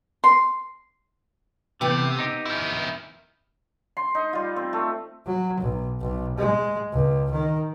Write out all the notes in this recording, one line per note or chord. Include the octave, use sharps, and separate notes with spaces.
C6
C3 E3 A3 B3 G5
D#4 G4
D#3 E4
C6
D#4
G3 F4
C4
A3
F#3
B1
B1
G#3
C#2
D#3